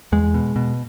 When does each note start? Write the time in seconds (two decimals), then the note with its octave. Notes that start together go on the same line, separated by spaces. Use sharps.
0.12 E2 G#3
0.34 B2
0.56 B2